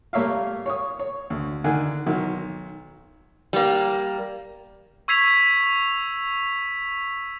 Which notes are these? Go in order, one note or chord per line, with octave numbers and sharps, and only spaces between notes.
G3 A3 A#3 C#5 E5 F5
C#5 C#6 D#6
C#5
D2
D3 D#3 F#5 G#5
B1 B2 D#3
G3 A#3
C#6 E6 G#6 B6 C7 F7